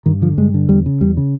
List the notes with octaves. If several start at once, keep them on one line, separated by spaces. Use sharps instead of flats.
G2 D#3
D3 F3
G2 G#3
D3
E2 G3
C#3
E2 G3
C#3